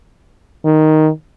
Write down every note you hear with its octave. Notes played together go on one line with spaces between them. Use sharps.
D#3